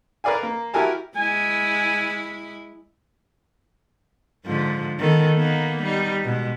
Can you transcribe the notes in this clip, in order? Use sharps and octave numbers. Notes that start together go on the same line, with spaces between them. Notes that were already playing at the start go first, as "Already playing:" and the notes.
A#4 B4 D5 F5 G#5
A#3
E4 F#4 G4 A#4 G#5 A5
G#3 E4 G#5
G#2 D3 F3
D#3 B3 A4
A#3 B3 D#4
G3 D#4
B2 G#3